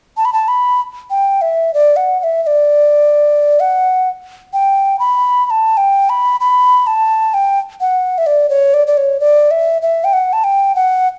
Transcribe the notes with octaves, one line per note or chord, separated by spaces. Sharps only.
A5
B5
A5
B5
G5
E5
D5
F#5
F#5
E5
E5
D5
F#5
G5
B5
B5
A5
G5
B5
B5
A5
G5
F#5
E5
D5
C#5
D5
D5
C#5
D5
E5
E5
G5
F#5
A5
G5
F#5